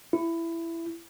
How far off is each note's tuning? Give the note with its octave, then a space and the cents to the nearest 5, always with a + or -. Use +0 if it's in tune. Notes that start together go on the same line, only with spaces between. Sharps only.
E4 +15